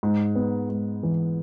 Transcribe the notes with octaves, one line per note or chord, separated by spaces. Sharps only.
G#2
B3
G#2
E3